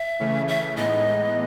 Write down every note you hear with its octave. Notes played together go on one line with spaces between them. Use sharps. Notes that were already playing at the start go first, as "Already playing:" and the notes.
Already playing: E5
C#3 E3 A3 C#4
E5
A2 E3 G#3 B3 D#4 D#5